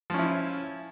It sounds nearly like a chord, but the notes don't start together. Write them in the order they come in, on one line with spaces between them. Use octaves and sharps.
F3 C#4 E4